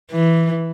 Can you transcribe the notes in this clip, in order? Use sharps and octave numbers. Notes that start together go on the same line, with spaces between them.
E3